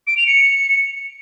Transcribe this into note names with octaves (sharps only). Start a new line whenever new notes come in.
D7
F7
C#7